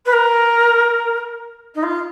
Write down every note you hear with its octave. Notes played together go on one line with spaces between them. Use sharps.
B4
A#4
D#4
F4